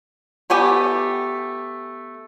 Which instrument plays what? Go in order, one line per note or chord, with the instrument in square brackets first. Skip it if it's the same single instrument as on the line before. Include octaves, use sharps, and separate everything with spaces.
[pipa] A3 B3 G4 G#5